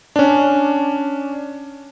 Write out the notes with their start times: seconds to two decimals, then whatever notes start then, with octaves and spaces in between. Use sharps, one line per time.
0.16 C#4 D4